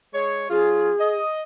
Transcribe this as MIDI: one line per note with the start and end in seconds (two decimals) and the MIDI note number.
0.14 0.46 56
0.14 0.46 68
0.14 0.46 73
0.50 0.91 53
0.50 0.91 61
0.50 0.91 65
0.50 1.18 68
1.00 1.41 75